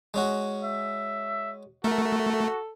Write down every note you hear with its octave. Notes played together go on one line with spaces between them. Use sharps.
G#3 C#4 F#4
E5
A3 F#4 A4 A#4